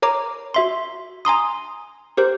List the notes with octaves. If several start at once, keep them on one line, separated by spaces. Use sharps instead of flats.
A#4 C#5 A#5 D6
F#4 E5 C6
G#5 A#5 C6 D#6
G4 A#4 C5